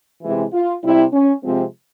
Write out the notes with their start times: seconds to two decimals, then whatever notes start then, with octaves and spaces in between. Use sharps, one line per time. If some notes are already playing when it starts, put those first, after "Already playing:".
0.23 C3 E3 G#3 E4
0.53 F4
0.83 C3 G3 E4
1.13 C#4
1.43 C3 F3 G#3 C4